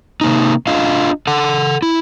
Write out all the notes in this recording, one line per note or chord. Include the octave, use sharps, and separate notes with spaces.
C3 A#3 D#4
D4 F4 D#5 F5
A4 F#5
E4